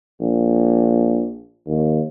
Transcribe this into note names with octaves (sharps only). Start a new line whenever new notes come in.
A#1
D#2